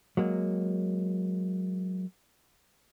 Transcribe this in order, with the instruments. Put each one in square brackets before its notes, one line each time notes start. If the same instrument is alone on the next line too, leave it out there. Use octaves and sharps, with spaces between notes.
[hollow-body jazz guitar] F#3 G#3 A#3